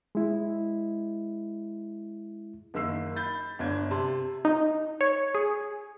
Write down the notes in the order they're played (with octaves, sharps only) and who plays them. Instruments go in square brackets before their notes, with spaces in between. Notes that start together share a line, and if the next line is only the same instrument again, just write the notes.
[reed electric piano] G#3 E4
[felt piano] F#1 D#3 E6 C7
B5 G6 A6
G1 D4 G#6
C3 A5 C6
[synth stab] D#4
C#5
G#4